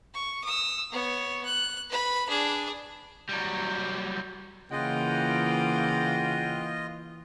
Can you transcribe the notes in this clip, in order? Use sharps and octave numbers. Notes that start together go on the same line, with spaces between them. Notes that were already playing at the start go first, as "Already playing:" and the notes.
C#6
D#6 E6
B3 C#5
F#6
B4 B5
D4 G#4
F#3 G3
C#3 E3 A#3 F4 D#5 F#5 G5